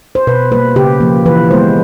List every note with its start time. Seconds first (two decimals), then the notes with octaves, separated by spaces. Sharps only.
0.15 C5
0.27 B2 B4
0.51 G3 A#3 B4
0.76 C#3 G4
1.00 F3 A#3
1.26 E3 B4
1.51 G#3 B3 C5